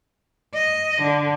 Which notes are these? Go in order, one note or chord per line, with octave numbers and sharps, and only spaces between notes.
D#5
D3